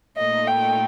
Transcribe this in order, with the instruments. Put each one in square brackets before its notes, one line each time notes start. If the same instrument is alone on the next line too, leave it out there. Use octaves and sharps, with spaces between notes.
[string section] A#2 A3 D#4 [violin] D#5
[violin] G5